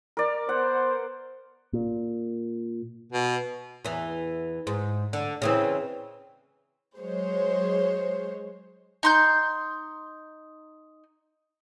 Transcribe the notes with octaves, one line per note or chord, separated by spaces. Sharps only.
A#4 D5
B3 C5 F#5
A#2
B2
E2 E3
G#2
D3
C#3 E3 C4
F#3 G#3 C5 C#5
D#4 C6 G6